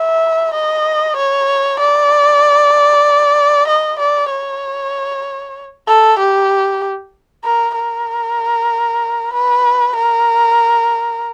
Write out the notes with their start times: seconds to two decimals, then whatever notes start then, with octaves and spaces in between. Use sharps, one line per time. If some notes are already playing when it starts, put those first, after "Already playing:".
Already playing: E5
0.54 D#5
1.16 C#5
1.80 D5
3.68 D#5
3.99 D5
4.31 C#5
5.88 A4
6.19 G4
7.45 A#4
7.76 A#4
9.34 B4
9.96 A#4